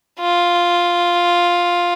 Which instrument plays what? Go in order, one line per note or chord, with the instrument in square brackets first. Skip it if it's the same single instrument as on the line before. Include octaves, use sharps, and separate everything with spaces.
[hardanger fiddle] F4